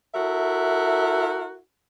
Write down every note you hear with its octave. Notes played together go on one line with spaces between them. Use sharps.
E4 F#4 A4 A#4 E5